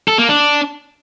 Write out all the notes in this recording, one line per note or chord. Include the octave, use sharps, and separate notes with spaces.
A4
A#3
D4